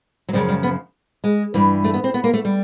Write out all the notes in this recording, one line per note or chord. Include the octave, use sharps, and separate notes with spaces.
F#3
F#2 C#3 F3 G3
G3
B3
G#3
G2 E3
A3
B3
C4
B3
A#3
A3
G3